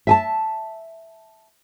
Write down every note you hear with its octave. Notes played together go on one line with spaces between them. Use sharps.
E5 G#5 A5